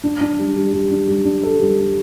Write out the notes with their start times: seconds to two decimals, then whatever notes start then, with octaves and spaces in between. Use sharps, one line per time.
0.04 D4
0.21 D4
0.39 G3
0.56 G3
0.73 G3
0.91 D4
1.08 G3
1.25 D4
1.43 A4
1.60 G3
1.77 G3